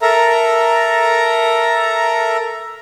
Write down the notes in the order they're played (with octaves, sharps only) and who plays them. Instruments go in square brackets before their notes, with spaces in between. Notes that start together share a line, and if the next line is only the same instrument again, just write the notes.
[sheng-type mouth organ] A4 A#4 E5 A#5